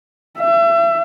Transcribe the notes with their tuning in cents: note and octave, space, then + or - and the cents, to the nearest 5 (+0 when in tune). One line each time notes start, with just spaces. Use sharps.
E5 +35